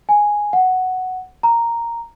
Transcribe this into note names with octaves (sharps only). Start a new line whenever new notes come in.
G#5
F#5
A#5